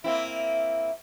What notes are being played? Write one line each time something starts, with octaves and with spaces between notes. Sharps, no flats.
A#3 C4 E4 E5